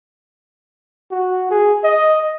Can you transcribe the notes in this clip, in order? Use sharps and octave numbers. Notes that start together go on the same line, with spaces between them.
F#4
G#4
D#5